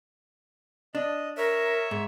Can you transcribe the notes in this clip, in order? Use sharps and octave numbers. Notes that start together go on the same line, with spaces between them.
D4 D#5
A#4 C#5 E5
G#2